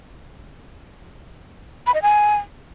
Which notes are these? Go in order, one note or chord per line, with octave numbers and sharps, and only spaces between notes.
B5
D#5
G#5